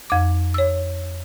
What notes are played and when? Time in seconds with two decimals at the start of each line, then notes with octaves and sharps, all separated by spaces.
0.10 F2 D6
0.54 C#5 E6